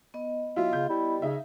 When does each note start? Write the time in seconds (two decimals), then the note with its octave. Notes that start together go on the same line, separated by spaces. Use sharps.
0.14 B3 D#5
0.56 F#3 E4 F4
0.73 C#3 G6
0.89 G3 E4
1.22 C#3 D#4 E5